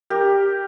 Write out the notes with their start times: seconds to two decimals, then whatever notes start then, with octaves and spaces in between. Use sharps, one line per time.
0.10 G4 A#4